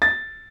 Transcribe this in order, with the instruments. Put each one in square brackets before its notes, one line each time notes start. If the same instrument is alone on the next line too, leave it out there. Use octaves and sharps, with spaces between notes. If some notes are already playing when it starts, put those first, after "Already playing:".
[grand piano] A6